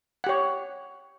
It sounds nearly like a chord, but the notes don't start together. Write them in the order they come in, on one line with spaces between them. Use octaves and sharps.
F#5 G4 C#5